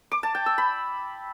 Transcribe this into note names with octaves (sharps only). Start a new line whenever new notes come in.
D6
A5
G5
E6
B5